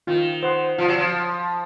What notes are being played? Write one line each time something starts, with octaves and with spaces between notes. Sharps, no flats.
D#3 F4
C5 F#5 C6
F3 F4
F#3
F3